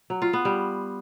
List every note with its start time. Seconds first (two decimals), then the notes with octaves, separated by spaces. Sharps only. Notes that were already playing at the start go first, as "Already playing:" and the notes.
0.10 F#3
0.22 F4
0.33 B3
0.45 G3